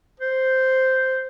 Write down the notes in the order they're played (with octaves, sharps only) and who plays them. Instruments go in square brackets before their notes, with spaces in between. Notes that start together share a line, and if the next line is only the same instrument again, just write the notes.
[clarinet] C5